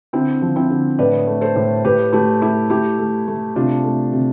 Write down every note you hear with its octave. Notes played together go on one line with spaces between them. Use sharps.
D3 C4 E4
F3
C4 E4
D3
A2 B4 D5
A3
A4 C5
A2
A2 G4 B4
A3 E4 G4
A3 E4 G4
A3 E4 G4
A3
A3
C3 D4 F4
A3
C3